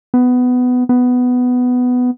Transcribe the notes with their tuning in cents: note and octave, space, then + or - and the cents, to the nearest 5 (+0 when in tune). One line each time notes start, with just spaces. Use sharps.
B3 +15
B3 +10